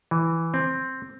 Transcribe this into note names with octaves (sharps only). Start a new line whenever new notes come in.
E3
C4